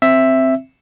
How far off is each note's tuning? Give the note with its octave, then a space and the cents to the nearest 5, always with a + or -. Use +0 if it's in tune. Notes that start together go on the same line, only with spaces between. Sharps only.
C4 +0 E5 +0